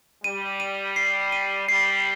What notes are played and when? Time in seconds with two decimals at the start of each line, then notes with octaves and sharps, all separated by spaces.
0.24 G3 D#7
0.60 D#7
0.96 C7
1.32 D#7
1.68 G3 C7